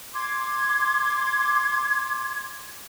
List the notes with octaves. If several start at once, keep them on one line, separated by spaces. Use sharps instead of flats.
C6 D6 G#6